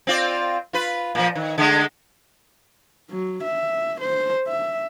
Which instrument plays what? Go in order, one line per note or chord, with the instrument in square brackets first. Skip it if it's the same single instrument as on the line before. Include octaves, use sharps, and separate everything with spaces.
[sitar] C4 F4 D5
F4 B4
A#2 F3
D#3
D3 G#3 A3
[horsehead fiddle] F#3
E5
C5
E5